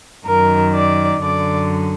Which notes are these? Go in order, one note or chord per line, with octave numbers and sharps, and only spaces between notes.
F#2 D#3 A#4
D5
F#2 D3 D5